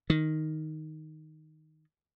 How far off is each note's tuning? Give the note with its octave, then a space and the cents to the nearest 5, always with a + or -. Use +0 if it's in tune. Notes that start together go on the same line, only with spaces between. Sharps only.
D#3 +0